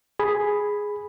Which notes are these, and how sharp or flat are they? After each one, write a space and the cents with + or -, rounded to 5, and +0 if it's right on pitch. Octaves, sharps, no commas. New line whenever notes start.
G#4 +0 B5 +0